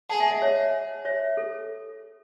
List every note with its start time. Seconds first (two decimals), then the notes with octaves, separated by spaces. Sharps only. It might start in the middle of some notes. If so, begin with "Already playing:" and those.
0.09 G#4 F#5 A5
0.20 E5 G#5
0.31 D#5 F#5
0.42 C#5 E5
1.05 C#5 E5
1.37 A4